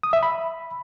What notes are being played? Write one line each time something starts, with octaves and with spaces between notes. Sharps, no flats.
D#6
E5
B5